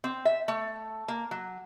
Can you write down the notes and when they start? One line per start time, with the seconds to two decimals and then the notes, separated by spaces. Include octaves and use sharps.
0.04 C4
0.25 E5
0.48 A3
1.08 A#3
1.31 F#3